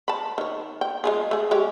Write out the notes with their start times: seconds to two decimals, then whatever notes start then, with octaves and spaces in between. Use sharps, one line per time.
0.08 A5 B5
0.38 D#3 C#5
0.81 G5
1.04 G#3 F4 G#4
1.31 A3 G#4
1.51 G#3 G4 C#5